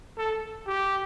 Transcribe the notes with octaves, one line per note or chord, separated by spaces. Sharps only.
A4
G4